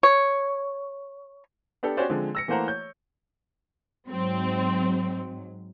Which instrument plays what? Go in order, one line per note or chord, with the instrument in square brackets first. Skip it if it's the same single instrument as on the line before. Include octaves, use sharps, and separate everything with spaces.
[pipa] C#5
[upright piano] B3 D4 G4 A4
C#4 F#4 G4 C5 D5
D3 F3 G#3 C4
E6 A#6 C#7
E3 A3 A#3 C5 F#5 A#5
C#5 G6
[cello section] G#2 F#3 [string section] C4